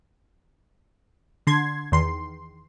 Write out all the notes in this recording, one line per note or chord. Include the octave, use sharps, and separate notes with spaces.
D3 C6 G#6
E2 D#3 C6